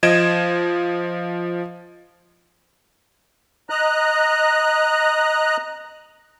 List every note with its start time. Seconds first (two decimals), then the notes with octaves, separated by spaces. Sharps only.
0.03 F3 D#5 G#6 D7 E7
3.70 D#5 A#5 F#6